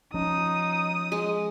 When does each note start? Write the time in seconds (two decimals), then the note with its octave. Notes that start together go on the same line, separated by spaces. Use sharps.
0.14 F3 C#4 D#4 D#6
1.12 G#3